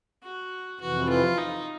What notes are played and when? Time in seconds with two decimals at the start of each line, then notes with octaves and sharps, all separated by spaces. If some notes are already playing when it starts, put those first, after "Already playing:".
0.23 F#4
0.80 F2 C3 E3 F#4
1.10 F4
1.38 D#4